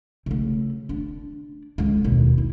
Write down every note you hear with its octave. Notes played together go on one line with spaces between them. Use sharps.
C#3 A3
D4
C#2 D3
D#2 B2
E4